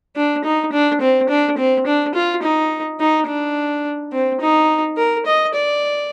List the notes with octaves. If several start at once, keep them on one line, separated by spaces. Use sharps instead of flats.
D4
D#4
D4
C4
D4
C4
D4
F4
D#4
D#4
D4
C4
D#4
A#4
D#5
D5